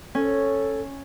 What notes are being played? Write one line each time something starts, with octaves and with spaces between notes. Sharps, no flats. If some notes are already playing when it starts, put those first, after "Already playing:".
C#4 A4